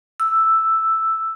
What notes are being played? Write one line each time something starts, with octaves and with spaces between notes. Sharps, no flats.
E6